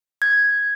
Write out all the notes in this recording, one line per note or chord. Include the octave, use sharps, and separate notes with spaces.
G#6